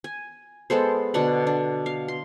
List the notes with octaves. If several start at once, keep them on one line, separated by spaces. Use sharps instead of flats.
G#5
G#3 B3 A4 C5
B2 D3 D4 F#5
D4
F5
C6